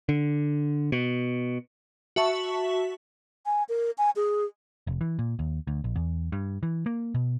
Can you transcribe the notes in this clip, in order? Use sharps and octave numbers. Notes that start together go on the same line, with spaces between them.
D3
B2
F#4 E5 A5 C#6
G#5
A#4
G#5
G#4
F1
E3
A#2
D#2
D2
A#1
E2
G2
E3
A#3
B2